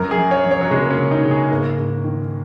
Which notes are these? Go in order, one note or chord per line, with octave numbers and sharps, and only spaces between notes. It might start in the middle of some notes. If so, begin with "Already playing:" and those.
Already playing: F#2 A#4
G#4
F#2
C#5
F#2
C#5
F#3
C#3 G#3
A#3
C#4
C#3
D#4
C#3
G#4
G#2 A#3
G#2
D#3